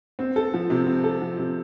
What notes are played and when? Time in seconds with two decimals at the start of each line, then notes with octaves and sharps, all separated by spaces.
0.19 C4
0.36 A4
0.54 F3
0.70 C3
0.87 C4
1.04 A4
1.21 F3
1.39 C3